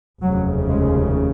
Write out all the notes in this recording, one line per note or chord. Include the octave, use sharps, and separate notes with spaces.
F1 D#2 C#3 F#3
G#3